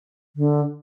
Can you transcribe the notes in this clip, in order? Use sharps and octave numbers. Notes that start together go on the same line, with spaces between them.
D3